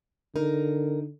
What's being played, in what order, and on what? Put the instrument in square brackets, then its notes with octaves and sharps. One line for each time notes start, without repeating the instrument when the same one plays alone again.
[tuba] D3 [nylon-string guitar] D#4 [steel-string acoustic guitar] A#4